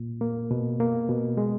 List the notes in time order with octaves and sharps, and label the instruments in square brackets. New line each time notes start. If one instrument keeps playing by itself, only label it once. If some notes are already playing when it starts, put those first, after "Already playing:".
Already playing: [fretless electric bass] A#2
[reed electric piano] A#3
B2
A#3
B2
G#3